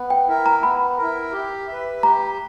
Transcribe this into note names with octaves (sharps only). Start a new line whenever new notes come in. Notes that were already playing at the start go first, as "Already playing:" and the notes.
Already playing: B3
G5
E4 A#4
A#5
B3 B5
E4 A#4
G4
B4 E5
G4 A#5